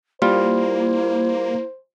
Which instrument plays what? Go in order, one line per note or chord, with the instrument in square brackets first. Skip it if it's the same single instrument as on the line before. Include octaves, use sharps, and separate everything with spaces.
[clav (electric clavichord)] G3 F4 [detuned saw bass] A#3 [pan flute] E4 [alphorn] C5